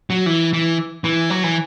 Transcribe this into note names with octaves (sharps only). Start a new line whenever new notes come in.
F#3
E3
E3
E3
F#3
E3